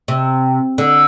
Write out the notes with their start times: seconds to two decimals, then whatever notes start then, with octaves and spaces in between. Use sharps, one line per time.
0.08 C3
0.78 D3